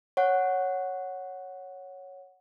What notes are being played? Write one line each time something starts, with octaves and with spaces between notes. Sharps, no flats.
C#5 F#5